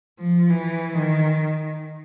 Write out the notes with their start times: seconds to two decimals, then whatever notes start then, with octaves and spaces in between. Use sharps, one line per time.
0.19 F3
0.50 E3
0.98 D#3